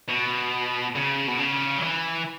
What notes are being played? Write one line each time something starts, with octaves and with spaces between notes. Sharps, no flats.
B2
C#3
B2
C#3
F#3
E3